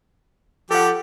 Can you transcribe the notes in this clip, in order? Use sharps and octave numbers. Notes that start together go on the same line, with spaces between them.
F3 G4 A4 F#5